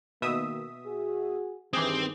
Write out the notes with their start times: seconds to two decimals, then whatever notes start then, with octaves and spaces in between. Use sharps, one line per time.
0.22 B2 D#3 A#3 E5 D#6
0.86 F#4 G#4
1.73 G2 D#3 E3 C4 G4 G#4